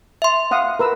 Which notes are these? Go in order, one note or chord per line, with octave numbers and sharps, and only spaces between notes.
E5 C6
F5 F#5 D#6
A#4 B4 E6